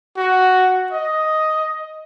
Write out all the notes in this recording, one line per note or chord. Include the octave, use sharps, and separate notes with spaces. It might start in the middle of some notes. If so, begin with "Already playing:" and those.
F#4
D#5